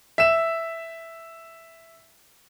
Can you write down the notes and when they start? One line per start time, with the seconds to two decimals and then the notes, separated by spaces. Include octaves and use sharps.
0.18 E5 E7